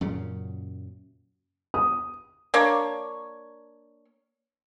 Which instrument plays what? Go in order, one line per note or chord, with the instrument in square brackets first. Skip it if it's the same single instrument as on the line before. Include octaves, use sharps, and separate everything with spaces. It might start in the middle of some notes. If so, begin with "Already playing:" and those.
[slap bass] F#2 A#2 C#3
[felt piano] D#6
[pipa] A#3 D4 C#5